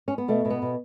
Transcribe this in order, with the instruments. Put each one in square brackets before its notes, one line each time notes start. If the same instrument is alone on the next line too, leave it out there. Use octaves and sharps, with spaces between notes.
[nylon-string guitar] C#4
B3
B2 A3
B2
B3
B2